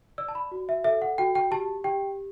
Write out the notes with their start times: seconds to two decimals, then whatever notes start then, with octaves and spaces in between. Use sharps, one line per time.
0.18 D5 E6
0.28 A5
0.35 B5
0.51 F#4
0.69 E5
0.84 A4 E5
1.02 F#5
1.18 F#4 G5
1.35 G5
1.51 G4 A5
1.84 G4 G5